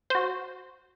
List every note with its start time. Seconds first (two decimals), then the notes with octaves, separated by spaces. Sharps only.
0.10 F#4 C5